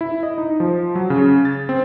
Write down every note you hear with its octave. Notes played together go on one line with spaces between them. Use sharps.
E4
D#5
D#4
F3
F#3
C#3
A6
C4